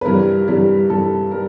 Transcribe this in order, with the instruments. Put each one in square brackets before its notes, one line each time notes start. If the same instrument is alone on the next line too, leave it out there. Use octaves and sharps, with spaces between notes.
[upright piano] B4
G2 E3 G3 A#4
G2 E3 G3
G2 E3 G3 A4
G3 A#4